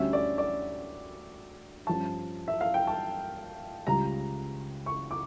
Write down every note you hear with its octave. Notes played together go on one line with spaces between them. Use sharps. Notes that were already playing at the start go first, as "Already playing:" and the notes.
Already playing: D2 D3 G3 C#4 E5
D5
D5
G2 F3 C#4 A5
E5
F5
G5
A5
C#2 C#3 G3 A#5
C#6
D6